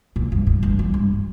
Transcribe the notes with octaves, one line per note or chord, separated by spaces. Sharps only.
A#2
G2
A2
G2
F2
G2